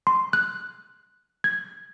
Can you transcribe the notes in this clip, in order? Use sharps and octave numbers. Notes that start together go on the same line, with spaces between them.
C6
F#6
G#6